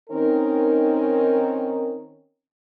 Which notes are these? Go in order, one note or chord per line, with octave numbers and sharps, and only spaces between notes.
D#3 C4 C#4 D#4 A#4